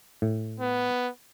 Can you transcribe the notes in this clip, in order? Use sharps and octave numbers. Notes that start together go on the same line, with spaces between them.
A2
B3